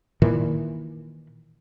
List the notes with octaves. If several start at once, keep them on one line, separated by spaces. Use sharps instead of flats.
A#2 D#3 E3